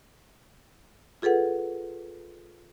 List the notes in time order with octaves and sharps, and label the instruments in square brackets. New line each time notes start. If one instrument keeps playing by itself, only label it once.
[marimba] F4 G#4 A4 B4 F#5